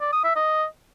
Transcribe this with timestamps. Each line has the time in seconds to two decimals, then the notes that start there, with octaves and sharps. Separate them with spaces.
0.01 D5
0.12 D#6
0.24 E5
0.36 D#5